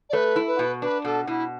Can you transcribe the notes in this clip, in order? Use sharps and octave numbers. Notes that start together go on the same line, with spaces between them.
D5
A3 B4
E4
B4
B2
D4 B4
B2 A4
B2 E4